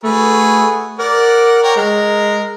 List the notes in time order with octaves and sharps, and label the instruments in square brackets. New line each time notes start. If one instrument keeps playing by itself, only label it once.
[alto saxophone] A3 [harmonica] F#4 G#4 B4
[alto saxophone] A#4 [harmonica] D5 F#5
[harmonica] A#4 C#5 G5
[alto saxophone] G#3 [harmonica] A#4